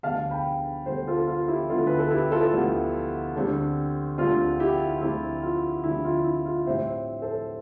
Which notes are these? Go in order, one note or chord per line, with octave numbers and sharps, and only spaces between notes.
D2 D3 G3 B3 D4 F5 A5
G5 B5
D2 D3 G3 B3 D4 A4 C5
F4 A4
F4
E4 G4
D2 D3 G3 B3 D4 F4 A4
B4
A4
E4 G4
F4 A4
D2 D3 G3 B3 D4
D2 D3 G3 C4
D2 D3 G3 C4 F4
E4 G4
D2 D3 G3 C4 E4 G4
F4
D2 D3 G3 C4 E4
F4
E4
F4
A2 G3 C4 C5 E5
A4 C5